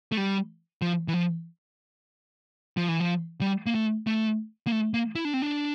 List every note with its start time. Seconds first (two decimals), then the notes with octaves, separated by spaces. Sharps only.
0.12 A3
0.17 G3
0.82 F3
1.08 E3
1.14 F3
2.77 F3
2.88 E3
3.00 F3
3.41 G3
3.66 A#3
3.75 A3
4.07 A3
4.67 A#3
4.72 A3
4.94 A#3
5.15 E4
5.25 D4
5.34 C4
5.42 D4